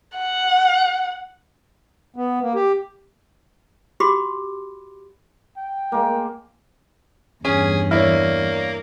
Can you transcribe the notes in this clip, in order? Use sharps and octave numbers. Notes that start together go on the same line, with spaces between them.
F#5
B3
A#3
G4
F#4 G4 B5 C6 D6
G5
G#3 A#3
E2 G2 C#4 G#4
A#3 E4 C#5 D5 F6